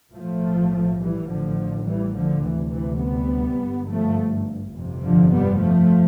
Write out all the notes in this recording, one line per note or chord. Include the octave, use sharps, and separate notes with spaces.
B1 A2 F3 A3
E3 G3
A1 A2 D3 F3
E3 G3
D3 F3
D2 C3 E3
E3
G3 B3
G1 G2
F3 A3
G1 F2 C3
D3 F3
G3 B3
F3 A3